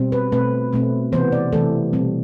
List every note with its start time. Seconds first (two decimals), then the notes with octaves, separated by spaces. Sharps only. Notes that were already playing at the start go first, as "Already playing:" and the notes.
Already playing: B2 G3 C4
0.12 B4
0.32 B2 A3 C4 B4
0.73 B2 A3 C4
1.12 C3 E3 B3 C5
1.32 D5
1.53 C3 E3 A3 A4
1.93 B2 G3 C4